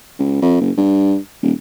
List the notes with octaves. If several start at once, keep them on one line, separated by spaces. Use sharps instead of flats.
C#2
F2
F#1
G2
D#1